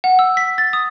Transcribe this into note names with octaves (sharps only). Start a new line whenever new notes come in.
F#5
E6
B6
A6
D#6